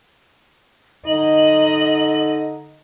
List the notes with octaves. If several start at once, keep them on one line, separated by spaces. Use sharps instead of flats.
D3 D#4 D#5 F#7